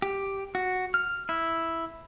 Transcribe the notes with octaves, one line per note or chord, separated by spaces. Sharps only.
G4
F#4
F6
E4